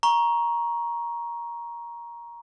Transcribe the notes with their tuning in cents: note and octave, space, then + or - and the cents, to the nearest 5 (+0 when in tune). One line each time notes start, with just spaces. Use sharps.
A#5 +15 C#6 +0